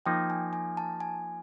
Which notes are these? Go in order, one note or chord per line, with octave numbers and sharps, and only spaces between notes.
F3 A#3 D#4 G5
G#5
G#5
A5
G#5